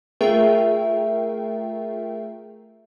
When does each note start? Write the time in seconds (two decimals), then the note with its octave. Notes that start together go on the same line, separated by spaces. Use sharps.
0.21 A3 F4 G#4 A#4 E5 G5